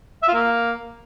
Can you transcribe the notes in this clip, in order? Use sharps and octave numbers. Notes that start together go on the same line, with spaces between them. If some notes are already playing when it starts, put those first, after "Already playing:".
E5
F4
A#3